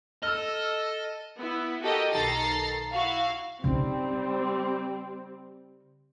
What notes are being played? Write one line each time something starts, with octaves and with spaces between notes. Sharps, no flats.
A4 D#5 E6 F6
B3 E4
F#4 G4 A4 A#4 D#5
B1 D#3 A4 A#5 A6 C7
E4 F#4 F5
C#3 G3 C4 D#4